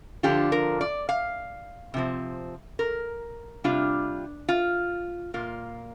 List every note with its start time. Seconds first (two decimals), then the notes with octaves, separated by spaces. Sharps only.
0.23 D3 F3 D4 F4 G4
0.52 A#4
0.81 D5
1.09 F5
1.94 C3 F3 C4
2.79 A#4
3.64 C3 G3 D4 F4
4.49 F4
5.34 A#2 A#3 F4